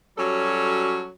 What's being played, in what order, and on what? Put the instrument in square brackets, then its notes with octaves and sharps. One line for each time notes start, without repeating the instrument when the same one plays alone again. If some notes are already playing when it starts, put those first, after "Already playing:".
[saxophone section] F#3 G3 C#4 F#4 A4